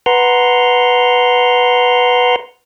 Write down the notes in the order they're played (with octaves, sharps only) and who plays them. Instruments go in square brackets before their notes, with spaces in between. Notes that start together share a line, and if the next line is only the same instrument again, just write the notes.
[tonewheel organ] B4 F#5 A#5 C6